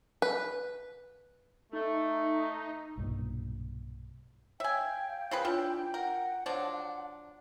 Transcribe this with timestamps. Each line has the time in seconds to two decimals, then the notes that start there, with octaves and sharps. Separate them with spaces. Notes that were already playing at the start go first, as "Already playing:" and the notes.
0.22 B4
1.73 A3 D#4
2.97 B1 G2 A#2
4.60 C#5 E5 F5 G5 G#5
5.31 C#3 F3 B4
5.45 E3 D4 F4 C#5
5.94 A#4 F#5
6.46 F3 F#3 D4 C#5 A5